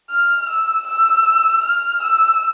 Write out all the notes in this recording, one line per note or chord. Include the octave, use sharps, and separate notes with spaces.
F6
E6
E6
F6
E6